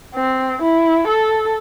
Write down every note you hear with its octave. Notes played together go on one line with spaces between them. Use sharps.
C4
E4
A4